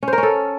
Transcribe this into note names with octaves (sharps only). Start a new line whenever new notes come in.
C#4
C5
A#4
C#4
A4